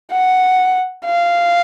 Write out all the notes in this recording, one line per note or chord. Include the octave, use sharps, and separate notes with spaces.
F#5
F5